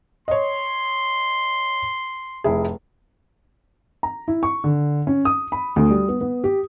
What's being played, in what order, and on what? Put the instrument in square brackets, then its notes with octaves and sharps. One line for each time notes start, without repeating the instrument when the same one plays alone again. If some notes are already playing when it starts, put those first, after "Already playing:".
[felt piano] C#5 D#5 [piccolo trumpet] C6
[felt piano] F1 E4 G#4
[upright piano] A#5
E4
C#6
D3
C#4
D#6
B5
D2
G3
B3
B3
G4